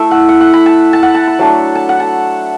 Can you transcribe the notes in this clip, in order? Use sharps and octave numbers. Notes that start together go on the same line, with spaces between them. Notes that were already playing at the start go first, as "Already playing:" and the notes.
Already playing: A3 E4 E5
F#5
F#5
F#5
B5
A5
A5
F#5
A5
B5
F#3 A3 D4
A5
F#5
A5